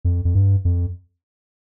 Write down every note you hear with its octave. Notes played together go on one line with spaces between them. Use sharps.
F2
F2
G2
F2